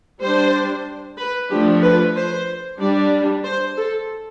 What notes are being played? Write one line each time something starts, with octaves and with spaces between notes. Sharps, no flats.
G3 D4 C5
B4
F3 A3 D4 G4
B4
C5
G3 D4 D5
C5
A4